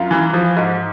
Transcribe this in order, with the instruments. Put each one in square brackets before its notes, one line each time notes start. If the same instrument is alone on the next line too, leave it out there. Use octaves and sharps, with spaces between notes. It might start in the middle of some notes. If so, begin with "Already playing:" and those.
Already playing: [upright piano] F#2 F4
E3
F3
G#2